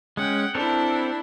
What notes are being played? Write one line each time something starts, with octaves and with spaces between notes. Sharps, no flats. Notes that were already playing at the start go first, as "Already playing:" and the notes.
G#3 C#4 F#5 G5
C4 D4 E4 A4 A#4